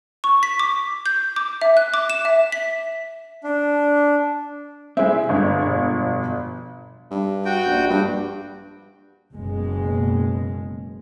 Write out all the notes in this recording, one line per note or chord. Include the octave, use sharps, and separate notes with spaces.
C#6
B6
D6
G6
D6
E5
F#6
D6
E7
E5
B6
D4
G#3 C4 E4 E5
C2
G1 D3 G#3 B3
F2 B2 C#5
G2
F#4 G5
A#1
G2
F#1 B2 G#3